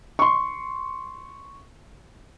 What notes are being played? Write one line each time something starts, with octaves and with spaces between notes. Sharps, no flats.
C6 C#6